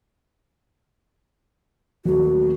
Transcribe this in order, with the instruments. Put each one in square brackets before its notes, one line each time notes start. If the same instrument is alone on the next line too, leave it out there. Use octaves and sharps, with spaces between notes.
[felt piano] D#1 A3 [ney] F#4